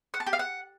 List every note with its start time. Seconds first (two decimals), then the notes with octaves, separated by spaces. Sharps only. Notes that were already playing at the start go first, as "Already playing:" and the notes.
0.14 F#5
0.20 A5
0.27 G4
0.33 F5
0.39 F#5